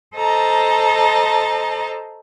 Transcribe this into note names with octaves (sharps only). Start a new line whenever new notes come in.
A4 C5 D#5 A5 A#5